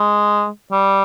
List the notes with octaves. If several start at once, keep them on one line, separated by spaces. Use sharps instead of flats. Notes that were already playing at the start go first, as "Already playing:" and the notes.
Already playing: G#3
G3